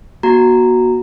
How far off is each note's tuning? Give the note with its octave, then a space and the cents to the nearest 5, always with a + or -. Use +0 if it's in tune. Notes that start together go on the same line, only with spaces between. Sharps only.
B3 -45 F#4 +0 A#5 -10